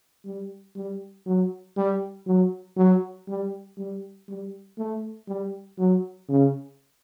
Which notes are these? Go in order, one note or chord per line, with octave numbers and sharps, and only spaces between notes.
G3
G3
F#3
G3
F#3
F#3
G3
G3
G3
A3
G3
F#3
C#3